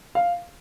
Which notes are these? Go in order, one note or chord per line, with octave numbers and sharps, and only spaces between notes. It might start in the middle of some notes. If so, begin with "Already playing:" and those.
F5